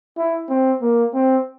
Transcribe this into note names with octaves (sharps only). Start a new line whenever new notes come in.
E4
C4
A#3
C4